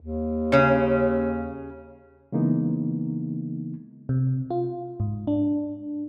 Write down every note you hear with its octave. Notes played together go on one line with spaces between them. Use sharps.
D#2
C#3 C#4 C#5
C#3 E3 G#3 A#3 B3 D#4
C3
F4
G#2
D4